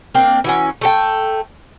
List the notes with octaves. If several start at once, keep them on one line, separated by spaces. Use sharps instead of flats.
A#3 C4 D4
E3 F#3 C#4
A3 A4 G5